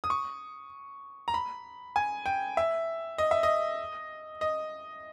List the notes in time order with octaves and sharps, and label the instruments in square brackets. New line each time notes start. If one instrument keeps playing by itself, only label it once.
[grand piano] D#6
C#6
A#5
B5
G#5
G5
E5
D#5
E5
D#5
D#5